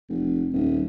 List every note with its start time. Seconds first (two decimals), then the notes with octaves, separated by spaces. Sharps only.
0.09 F1
0.53 D#1